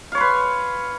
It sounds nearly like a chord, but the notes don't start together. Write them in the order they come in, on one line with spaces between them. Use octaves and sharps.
F5 C#5 C6 B4